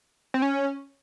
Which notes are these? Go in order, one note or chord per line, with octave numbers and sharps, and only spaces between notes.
C4
C#4